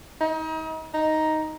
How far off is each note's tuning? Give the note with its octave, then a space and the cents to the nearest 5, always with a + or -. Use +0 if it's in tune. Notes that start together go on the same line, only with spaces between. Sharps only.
D#4 +35
D#4 +5